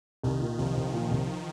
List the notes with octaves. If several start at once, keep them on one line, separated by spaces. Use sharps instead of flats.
C2 D#3
A#2
C2 F3
C2
A#2
C2